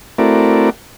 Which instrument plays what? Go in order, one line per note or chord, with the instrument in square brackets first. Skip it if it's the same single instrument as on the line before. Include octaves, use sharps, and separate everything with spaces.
[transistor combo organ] A3 C4 E4 F#4 A#4 D5